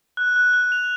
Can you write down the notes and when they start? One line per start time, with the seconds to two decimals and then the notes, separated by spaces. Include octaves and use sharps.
0.17 F#6
0.36 F#6
0.53 F#6
0.72 F7